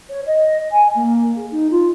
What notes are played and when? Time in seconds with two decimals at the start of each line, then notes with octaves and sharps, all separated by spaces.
0.09 C#5
0.26 D#5
0.71 G#5
0.94 A#3
1.35 G#4
1.51 D#4
1.70 F4